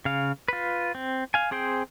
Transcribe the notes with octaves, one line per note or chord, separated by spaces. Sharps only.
C#3 F5
F4 B4
C4
F5 G#5
C4 G#4 C5 G5